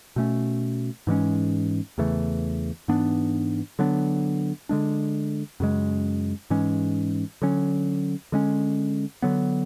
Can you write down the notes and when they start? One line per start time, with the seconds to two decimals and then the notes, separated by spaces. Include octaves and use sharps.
0.16 B2 A3 C#4
1.07 G#2 E3 G#3 C#4
1.98 E2 C#3 E3 A3
2.88 G#2 E3 B3 D4
3.79 D3 F#3 B3 D4
4.69 D3 G#3 D4
5.60 F#2 C#3 G#3
6.50 G#2 E3 G#3 C#4
7.42 D3 F#3 C#4
8.32 D3 G#3 C#4
9.22 D3 F#3 B3